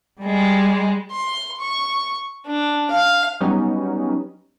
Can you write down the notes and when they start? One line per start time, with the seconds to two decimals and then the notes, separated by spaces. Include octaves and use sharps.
0.22 G3 G#3
1.12 C6
1.60 C#6
2.47 D4
2.91 F5
3.41 F#3 G3 B3 C#4 D#4